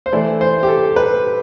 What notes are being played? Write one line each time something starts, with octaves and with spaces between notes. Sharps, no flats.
C5
E3 A3 E4 D5
C5
G4
A4
B4